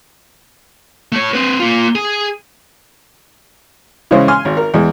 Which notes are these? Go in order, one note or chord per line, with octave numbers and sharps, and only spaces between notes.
A3 C#5
C4 B4
A#3 F4
G#4
C#3 E3 G#3 C#4 C5
G#5 C6 F6
G#1
A#4
E2 G#3